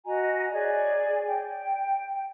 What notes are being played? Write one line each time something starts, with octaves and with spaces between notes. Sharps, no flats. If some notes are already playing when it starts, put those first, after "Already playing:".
F#4 D#5 G#5 A#5
G#4 C#5 D5 G#5
G5